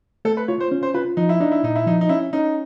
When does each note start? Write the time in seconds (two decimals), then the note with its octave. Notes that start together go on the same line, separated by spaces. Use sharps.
0.25 A3 A4
0.37 B4
0.48 F4 C#5
0.60 C5
0.72 C#4
0.83 C5
0.94 F4 B4
1.17 F3 D#4
1.29 E4
1.40 D4 D#4
1.52 E4
1.64 A#2 D#4
1.76 E4
1.87 F3 D#4
2.01 D#4
2.09 C#4 E4
2.33 C#4 D#4